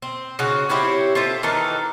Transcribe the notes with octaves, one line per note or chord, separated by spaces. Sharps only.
C4
C#3 F#4
C4 E4 G4 C#5
C4 F4 A4 E5
D#3 E3 A4 A#4